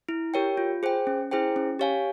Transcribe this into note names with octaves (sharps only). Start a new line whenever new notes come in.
E4
G4 A#4 C#5 G5
F4
G#4 C5 G5
C#4
E4 G#4 C5 G5
C#4
G4 C#5 F5 G#5